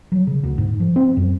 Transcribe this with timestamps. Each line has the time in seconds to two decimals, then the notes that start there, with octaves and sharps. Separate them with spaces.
0.12 F#3
0.27 C#3
0.43 D2
0.58 G#2
0.80 F3
0.96 C4
1.17 F#2